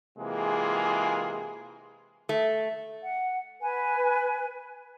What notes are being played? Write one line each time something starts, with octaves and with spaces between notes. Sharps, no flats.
C3 E3 G#3 A#3 F4 G#4
A3
F#5
B4 G#5